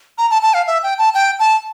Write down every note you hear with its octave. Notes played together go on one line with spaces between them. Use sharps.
A#5
A5
A5
F5
E5
G5
A5
G5
A5